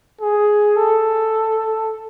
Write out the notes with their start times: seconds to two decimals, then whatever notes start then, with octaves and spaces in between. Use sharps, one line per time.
0.21 G#4
0.76 A4